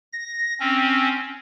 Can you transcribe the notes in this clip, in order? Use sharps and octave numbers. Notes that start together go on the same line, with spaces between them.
A#6
C4 C#4